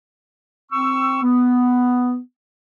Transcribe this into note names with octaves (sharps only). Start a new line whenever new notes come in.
C4 C#6 E6
B3